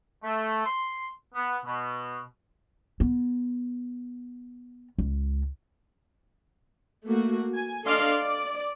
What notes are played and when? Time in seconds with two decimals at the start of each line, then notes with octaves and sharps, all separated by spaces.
0.23 A3
0.65 C6
1.35 B3
1.65 B2
3.00 B3
4.98 C#2
7.05 A3 A#3 F#4
7.54 G#5
7.86 D4 A4 D5 D#5 F5 C6
8.17 D5